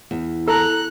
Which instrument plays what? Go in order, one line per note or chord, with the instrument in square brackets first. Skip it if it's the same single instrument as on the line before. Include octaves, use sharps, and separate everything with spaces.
[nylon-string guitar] E2
[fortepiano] A4 [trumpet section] A#5 [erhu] F#6